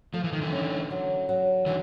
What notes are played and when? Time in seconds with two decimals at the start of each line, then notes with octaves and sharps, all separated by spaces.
0.13 F3 A3
0.24 E3
0.32 D#3
0.41 D3 E3
0.52 C#4
0.90 F#3
1.29 F#3
1.66 D3 E3 F#3